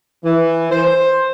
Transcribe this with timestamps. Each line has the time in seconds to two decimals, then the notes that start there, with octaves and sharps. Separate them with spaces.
0.24 E3
0.71 C5